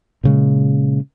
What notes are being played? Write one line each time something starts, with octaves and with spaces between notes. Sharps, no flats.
A#2 C#3 G#3